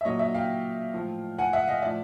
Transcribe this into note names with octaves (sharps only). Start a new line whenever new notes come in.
E5
A#2 F#3 C#5 D#5
D5 E5
F5 G5
A2 F3
F#5 G#5
E5 F#5
D#5 F5
A2 F3 D5 E5